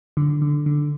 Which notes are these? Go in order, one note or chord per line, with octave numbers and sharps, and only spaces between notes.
D3
D3
D3